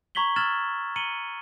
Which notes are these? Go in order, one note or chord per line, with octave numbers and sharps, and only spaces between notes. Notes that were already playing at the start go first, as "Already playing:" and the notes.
A#5 C#6 G#6 B6 F#7 G7
E6 F6 G#6 A6 E7 F#7
A#5 C#7 D#7 F#7 G7